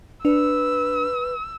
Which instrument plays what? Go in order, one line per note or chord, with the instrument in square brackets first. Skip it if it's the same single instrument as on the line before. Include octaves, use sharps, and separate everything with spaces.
[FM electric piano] D4 [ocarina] B4 [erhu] E6